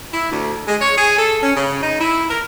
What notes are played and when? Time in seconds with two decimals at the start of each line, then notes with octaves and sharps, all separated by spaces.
0.13 E4
0.31 D2
0.67 G#3
0.81 C#5
0.98 G#4
1.19 A4
1.43 C#4
1.56 C#3
1.83 D#4
2.00 E4
2.30 A#4